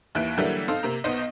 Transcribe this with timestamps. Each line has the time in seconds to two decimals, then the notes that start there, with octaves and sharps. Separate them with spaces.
0.15 D#2 E3 E4 F#6 D7
0.37 D3 E3 F#3 G3 A#3 E4
0.68 C4 D#4 A4 C5 F5
0.83 C3 A#3 C4 A#5
1.04 B1 B3 D#4 C5 D#5